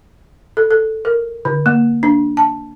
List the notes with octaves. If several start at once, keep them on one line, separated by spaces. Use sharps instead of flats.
A4
A4
A#4
D3
A#3
D4
A5